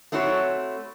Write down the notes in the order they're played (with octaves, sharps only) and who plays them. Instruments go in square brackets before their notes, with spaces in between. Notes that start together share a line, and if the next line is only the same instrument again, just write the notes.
[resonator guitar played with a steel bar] A3 C4 E4 F#4 C#5